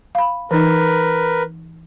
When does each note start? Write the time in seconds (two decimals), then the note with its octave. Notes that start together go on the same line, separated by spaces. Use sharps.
0.15 F5 B5
0.51 E3 D#4 A#4 B4